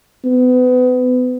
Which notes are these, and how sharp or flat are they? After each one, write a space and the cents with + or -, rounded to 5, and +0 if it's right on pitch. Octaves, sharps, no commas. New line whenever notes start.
B3 +30